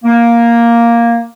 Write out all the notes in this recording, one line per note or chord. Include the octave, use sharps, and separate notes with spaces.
A#3